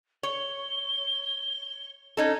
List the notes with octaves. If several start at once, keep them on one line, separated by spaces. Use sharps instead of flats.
C#5 G7
C#4 D#4 A4